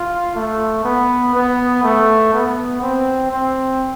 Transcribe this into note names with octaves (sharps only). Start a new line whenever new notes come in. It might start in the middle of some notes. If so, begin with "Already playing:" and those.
Already playing: F4
A3
B3
B3
A3
B3
C4
C4